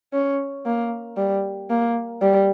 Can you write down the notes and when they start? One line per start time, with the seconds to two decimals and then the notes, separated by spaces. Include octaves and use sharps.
0.13 C#4
0.66 A#3
1.17 G3
1.70 A#3
2.22 G3